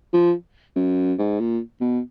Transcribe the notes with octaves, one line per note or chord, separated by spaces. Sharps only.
F3
F#2
G#2
A#2
B2